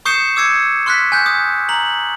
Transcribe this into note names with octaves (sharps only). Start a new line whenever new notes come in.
C#6 D#6 G6 C7 C#7 E7
D6 E6 G#6 C#7 D#7
C6 C#6 F6 F#6 A6 B6
G#5 F#6 G6
D#6
A#5 F#7